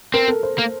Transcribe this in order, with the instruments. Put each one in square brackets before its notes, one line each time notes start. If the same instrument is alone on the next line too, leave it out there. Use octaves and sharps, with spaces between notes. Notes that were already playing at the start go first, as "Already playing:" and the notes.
[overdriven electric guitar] C4 [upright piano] A#4
[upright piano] A4
C5
[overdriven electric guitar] A#3